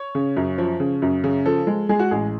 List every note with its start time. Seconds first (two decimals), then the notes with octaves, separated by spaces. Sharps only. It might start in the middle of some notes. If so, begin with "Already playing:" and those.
Already playing: C#5
0.15 C#3
0.37 F#2
0.58 F3
0.80 C#3
1.02 F#2
1.24 C#3
1.46 F3 A4
1.67 G#3
1.89 G#3 G#4
1.99 F#4
2.11 A1 G#4